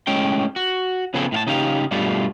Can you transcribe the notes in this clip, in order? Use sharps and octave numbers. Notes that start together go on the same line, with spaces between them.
A2 G#3 C#4 G5
F#4
C#3 F3 B3 C4 G#4 A4
A2 F5 A5
C#3 D#4 G4 F5
G2 B2 G3 A3 F4